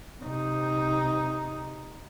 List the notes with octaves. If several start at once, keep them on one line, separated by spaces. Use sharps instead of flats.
C3 D#4